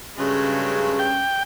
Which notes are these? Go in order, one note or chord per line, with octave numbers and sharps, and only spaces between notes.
G2 C#3 F#3 G#3 A3
G5